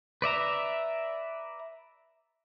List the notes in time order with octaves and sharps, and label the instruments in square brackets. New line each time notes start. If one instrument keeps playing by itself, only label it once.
[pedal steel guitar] B4 D5 E5 A#5